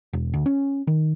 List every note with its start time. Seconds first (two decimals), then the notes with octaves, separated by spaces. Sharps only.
0.13 E1
0.34 D2
0.46 C#4
0.87 D#3